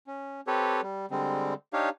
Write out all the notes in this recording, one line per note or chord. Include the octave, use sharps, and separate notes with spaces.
C#4
C4 G4 A4 B4 C#5
G3
D3 G3 G#3 C4
D4 D#4 G4 C#5 F5